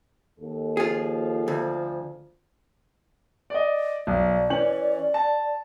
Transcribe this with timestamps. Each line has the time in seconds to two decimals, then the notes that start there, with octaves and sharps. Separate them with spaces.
0.40 D#2 A4
0.77 F3 F4 G#4
1.48 D2
3.50 D5 D#5
4.07 B1 D5
4.50 E3 C#4 F#7
5.14 A5